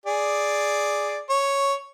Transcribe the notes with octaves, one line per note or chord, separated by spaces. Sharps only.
G#4 D5
C#5